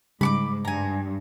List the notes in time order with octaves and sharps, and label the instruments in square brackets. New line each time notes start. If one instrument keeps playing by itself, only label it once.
[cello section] G#2 [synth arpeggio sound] C#3 G3 [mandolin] B5 C#6 D6
[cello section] G2 [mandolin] G#5 A#5